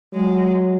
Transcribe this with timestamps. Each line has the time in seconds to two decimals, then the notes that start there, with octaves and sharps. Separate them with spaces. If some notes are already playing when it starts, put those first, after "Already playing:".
0.13 F#3 G#3